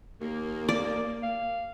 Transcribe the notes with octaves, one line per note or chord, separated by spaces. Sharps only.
D#2 A#3
D5
F5